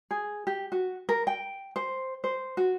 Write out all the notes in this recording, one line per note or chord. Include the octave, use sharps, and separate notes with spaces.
G#4
G4
F#4
A#4
G5
C5
C5
F#4